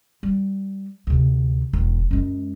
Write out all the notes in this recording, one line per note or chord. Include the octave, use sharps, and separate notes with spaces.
G3
D2 C3
E1 D#3
F#2 G#3